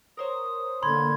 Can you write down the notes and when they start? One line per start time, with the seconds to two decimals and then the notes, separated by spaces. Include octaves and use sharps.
0.17 A#4 C5 C#5 D#6
0.83 D3 A#3 B5 C6 G#6